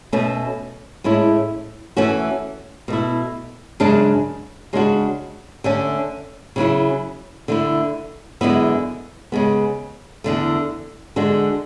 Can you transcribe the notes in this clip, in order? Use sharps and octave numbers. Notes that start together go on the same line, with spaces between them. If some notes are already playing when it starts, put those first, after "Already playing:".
B2 A3 C#4
A2 G#3 C#4 E4
E3 A3 C#4 F#4
B2 A3 E4
F#2 C#3 G#3 D4
C#3 G#3 D4 F#4
D3 A3 C#4
C#3 F#3 C#4 E4
D3 A3 E4
F#2 D3 G#3 B3 E4
C#3 G#3 B3
E2 D3 A3
D3 G#3 D4 F#4